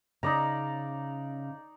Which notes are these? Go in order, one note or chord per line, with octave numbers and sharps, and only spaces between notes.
C#3 D#4 D5 A#5